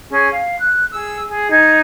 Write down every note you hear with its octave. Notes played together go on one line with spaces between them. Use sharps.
C#4 G#4
F5
F#6
G#4 E6
G#4
D#4 G#6